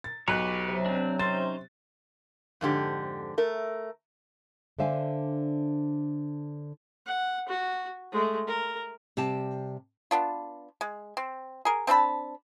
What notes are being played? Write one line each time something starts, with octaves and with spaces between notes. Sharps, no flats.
A6
B1 G4 B4 C#5 F#6
C3 F#3
C4 D4
C#4 D#4 C5 C6 A6
F2 G#2 D3 G4
A3 A#4
D3 D4 C5 E5 F5 G#5
F#5
F#4
G#3 A3
A#4
C3 G3 G4 A5
B3 D4 F4
G#3
C4
G#4 A#4
C4 D4 A5 B5